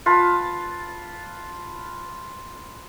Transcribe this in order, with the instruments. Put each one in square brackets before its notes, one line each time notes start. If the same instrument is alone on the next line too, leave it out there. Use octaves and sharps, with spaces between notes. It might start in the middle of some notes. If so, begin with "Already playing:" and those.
[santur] F4 B4 A5